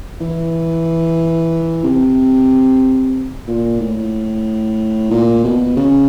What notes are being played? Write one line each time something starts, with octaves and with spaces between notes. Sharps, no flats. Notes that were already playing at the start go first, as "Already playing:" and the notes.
E3
C3
A#2
A2
A#2
B2
C#3